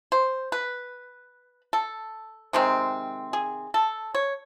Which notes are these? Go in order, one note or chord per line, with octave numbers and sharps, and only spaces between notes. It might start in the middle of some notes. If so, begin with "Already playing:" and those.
C5
B4
A4
C3 D#3 G#3 C4
G#4
A4
C#5